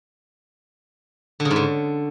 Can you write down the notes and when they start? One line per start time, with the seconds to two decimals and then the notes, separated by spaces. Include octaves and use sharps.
1.40 D3
1.45 C#3
1.50 G#2
1.56 D3